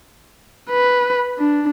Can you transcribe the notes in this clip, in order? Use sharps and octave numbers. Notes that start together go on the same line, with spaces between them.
B4
D4